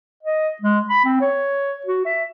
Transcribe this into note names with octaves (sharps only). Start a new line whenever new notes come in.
D#5
G#3
B5
C4
C#5
F#4
E5